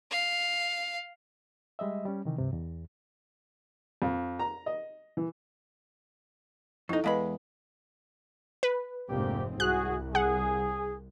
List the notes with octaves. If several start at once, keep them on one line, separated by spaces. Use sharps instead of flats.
F5
G3 G#3 D#5 E5
G3 C#4
C3 D#3 E3
C#2 G2 C3
E2
F2
A#5
D#5
E3
F2 D#4 E4 A4
E2 G#3 B4 D#5 F5 B5
B4
F1 G#2 D3 A#3 C4 G4
C2 F#4 G#4 F#6
G#4 F#5